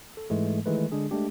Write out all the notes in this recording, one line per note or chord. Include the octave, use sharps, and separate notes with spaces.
A4
G#2 E3 G#3 A3
D#3 E3 G#3 A3 B4
D3 G#3 D4 G#4
G#3 A3 D4 G4